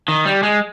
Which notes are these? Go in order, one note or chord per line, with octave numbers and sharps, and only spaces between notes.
D#3
G3
G#3